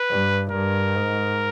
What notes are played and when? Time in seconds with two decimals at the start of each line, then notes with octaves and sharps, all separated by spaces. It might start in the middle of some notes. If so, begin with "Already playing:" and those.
Already playing: B4
0.10 G2
0.52 G2 A#4
0.96 G#2